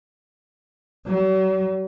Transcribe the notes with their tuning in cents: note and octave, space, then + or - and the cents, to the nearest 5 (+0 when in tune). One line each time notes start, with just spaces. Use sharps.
F#3 +45